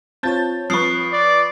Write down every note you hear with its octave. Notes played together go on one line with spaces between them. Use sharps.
C4 F4 C#5 A5 G6 A6
F3 B4 C#6 D#6 C7
D5